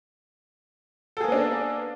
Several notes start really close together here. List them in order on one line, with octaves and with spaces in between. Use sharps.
A4 G#4 A#3 B3 D4